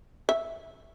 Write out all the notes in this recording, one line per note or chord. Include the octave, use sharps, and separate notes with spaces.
E5